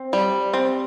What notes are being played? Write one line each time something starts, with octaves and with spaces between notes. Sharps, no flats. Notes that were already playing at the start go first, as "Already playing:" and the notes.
Already playing: C4
G3
C4